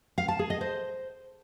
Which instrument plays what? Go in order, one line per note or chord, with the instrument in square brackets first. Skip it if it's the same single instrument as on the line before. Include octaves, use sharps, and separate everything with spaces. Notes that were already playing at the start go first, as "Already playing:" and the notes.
[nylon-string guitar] F5
A5
G#4
D#5
C5